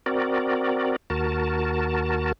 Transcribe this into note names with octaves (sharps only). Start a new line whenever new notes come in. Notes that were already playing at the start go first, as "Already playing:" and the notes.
C4 F#4 A#4 D5
D#2 F#4 A#4 A5